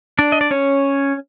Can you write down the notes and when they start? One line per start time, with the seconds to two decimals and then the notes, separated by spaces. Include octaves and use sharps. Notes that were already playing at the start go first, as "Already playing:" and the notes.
0.19 D4 D5
0.32 D#5
0.41 D5
0.51 C#4 C#5